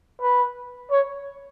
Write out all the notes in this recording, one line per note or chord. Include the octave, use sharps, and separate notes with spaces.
B4
C#5